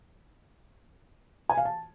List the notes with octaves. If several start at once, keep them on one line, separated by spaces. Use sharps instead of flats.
G#5
F5
A5